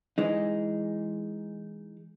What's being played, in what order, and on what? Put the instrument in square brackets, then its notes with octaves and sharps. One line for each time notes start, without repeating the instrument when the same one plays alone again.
[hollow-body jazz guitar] E3 G#3 D#4